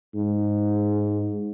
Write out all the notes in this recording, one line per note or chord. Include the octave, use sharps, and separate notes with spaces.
G#2